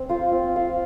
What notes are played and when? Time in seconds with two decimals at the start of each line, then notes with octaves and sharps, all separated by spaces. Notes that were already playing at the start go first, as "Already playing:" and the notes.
Already playing: C4
0.09 F4 C5 F5
0.32 C4
0.56 F4 C5 F5